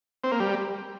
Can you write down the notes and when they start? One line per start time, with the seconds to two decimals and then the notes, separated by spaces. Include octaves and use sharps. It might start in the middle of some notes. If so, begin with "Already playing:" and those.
0.24 C4
0.32 A#3
0.40 G3